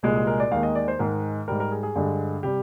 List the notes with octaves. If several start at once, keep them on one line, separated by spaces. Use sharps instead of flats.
C2 A#2 G#3 G#4
G#4
A#4
D5
D#2 D#3 G#3 F5
D#5
D5
C5
G#2 D#3 G#3 A#4
G#2 G3 A#4
A#4
G#4
G#4
G2 D3 G#3
C3 G3 G4